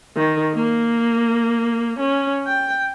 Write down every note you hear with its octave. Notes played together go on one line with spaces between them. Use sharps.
D#3
A#3
C#4
G5